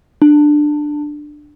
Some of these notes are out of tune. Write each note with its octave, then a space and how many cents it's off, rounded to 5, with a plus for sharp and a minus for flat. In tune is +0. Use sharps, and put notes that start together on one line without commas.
D4 +15